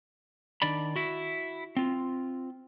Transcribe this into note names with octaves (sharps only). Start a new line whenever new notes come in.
D#3 D4 D5 B5
E4 F#4
C4 F4